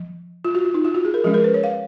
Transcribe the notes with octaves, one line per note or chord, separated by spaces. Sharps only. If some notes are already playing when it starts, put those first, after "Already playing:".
Already playing: F3
F4
F#4
F4
D#4
F4
F#4
G#4
A#4
F3 G#3 C#4 G#4
A#4
B4
C#5
F5